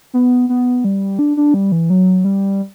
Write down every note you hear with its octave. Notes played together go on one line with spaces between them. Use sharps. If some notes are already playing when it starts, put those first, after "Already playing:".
B3
B3
G3
D4
D4
G3
E3
F#3
G3